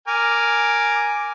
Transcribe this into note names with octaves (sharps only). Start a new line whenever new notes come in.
A#4 G#5 D6